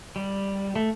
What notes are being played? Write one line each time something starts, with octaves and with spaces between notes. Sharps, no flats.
G3
A3